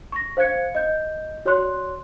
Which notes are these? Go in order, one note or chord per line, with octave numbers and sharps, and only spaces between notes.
C#6 A#6
C5 F5 F#6 G#6 C#7
D#5 G6
F#4 C#5 D5 C6 F#6